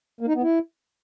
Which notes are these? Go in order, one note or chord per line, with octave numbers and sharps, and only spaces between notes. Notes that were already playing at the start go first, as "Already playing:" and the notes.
A#3
D#4
B3
E4